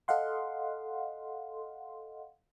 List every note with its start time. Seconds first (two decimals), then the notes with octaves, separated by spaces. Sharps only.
0.08 A4 D#5 F5 F#5 C6